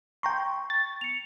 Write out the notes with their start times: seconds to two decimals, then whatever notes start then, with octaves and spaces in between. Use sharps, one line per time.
0.23 G5 A#5 C6 C#6
0.70 A6
1.01 C#7 F7